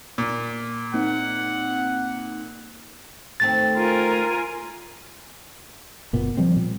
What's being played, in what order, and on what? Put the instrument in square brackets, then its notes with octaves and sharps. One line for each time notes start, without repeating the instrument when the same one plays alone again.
[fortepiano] A#2
[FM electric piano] A#3 C4 D#4 [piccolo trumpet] F#5
[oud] D#2 A3 C4 [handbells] A6
[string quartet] F4 A#4 G#5
[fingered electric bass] F#1 A#2 B3
F3 G3 C4
A#2